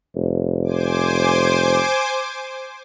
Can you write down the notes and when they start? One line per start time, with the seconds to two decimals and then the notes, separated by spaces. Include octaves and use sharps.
0.15 F1
0.64 C5 G#5 D6